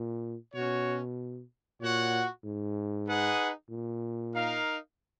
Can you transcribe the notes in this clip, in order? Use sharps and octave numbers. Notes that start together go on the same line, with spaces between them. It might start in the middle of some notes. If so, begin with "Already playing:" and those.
Already playing: A#2
B2 C#4 F#4 C#5
A#2 F#4 C#5 F#5
G#2
D#4 G#4 B4 F#5
A#2
D#4 A#4 F5